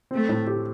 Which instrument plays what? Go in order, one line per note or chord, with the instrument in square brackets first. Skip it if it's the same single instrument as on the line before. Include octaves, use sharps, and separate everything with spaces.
[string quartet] A3 [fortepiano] C4
[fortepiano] A2
G4